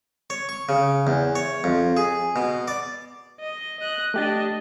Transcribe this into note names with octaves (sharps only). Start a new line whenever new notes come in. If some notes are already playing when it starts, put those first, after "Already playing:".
C#5
C#6
C#3
E2
C#5
F2
G#4
B2
D5
D#5
D#5 F#6
A3 D4 G4 D#5 A6